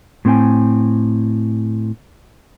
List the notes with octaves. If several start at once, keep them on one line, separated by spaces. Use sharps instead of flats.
A2 C4 G#4 G5 G#5